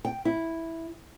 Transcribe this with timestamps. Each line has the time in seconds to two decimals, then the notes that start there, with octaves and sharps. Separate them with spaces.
0.05 G5
0.25 E4